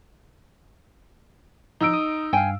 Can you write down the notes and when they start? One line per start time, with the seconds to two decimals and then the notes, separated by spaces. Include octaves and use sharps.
1.81 F3 D#4 E6 D7
1.93 D#6
2.33 G2 F5 G5 G#5